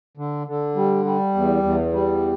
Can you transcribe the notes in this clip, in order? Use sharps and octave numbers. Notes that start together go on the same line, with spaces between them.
D3
D3
G3
G3
E2
E2
G3